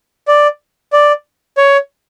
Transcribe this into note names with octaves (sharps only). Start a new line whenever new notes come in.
D5
D5
C#5